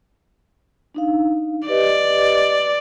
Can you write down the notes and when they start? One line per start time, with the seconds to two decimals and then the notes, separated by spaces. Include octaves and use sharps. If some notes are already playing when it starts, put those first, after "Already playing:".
0.95 D4 D#4 F5
1.68 G4 B4 D5 D#5